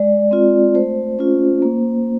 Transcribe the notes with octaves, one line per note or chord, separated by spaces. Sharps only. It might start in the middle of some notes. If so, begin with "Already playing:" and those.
Already playing: G#3 D5
C4 F4
A3 C5
C#4 F4
A#3